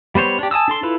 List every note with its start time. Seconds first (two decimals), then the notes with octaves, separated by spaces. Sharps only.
0.15 G3 B3 C5 C#5
0.39 D4 G4
0.51 G#5 A5 D#6 E6
0.68 D4 A4 C6
0.83 E4 F4 A4 B4